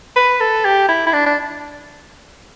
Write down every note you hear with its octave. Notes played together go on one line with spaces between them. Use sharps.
B4
A4
G4
E4
E4
D4
D4